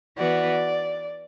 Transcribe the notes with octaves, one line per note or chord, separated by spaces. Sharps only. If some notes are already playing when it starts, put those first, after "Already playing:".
E3 B3 F#4 D5